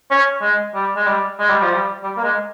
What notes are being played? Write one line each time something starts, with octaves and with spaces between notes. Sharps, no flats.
C#4
G#3
G3
G#3
G3
G#3
G3
F3
G3
G3
A#3
G#3